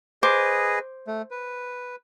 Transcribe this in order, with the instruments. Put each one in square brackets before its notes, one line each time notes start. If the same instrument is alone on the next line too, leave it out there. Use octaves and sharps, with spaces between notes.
[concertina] G#4 B4 D#5 [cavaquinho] C5 D6
[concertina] A3
B4